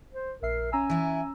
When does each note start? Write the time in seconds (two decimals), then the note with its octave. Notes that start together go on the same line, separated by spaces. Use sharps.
0.13 C5
0.42 A#1 A#4 E5 C7
0.72 C#4 G#5 A#5 E6
0.90 E3 E4